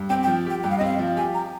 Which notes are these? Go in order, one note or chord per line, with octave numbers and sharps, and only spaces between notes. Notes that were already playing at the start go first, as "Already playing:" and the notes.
Already playing: G2
C4 G5
G5
F3
G4 G5
G2 G5
F5
D#5
C4 F5
F3
G4 G#5
A#5